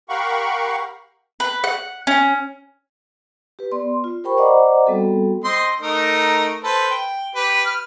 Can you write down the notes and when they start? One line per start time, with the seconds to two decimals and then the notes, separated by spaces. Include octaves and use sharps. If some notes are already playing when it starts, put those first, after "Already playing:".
0.09 G4 A#4 F5 F#5 B5 C#6
1.40 B4
1.64 F#5
2.07 C#4
3.59 G4 B4
3.72 B3 D5 C6
4.04 F4
4.24 G4 A#4 C5 G5 B5 C#6
4.37 C5 D5 D#5 F#5 A#5 D6
4.87 G3 B3 C4 F#4 A4
5.44 C4 D#5 C6
5.80 A3 D#4 A#4
6.64 A4 B4 C5
6.91 G5
7.35 G4 B4
7.66 F6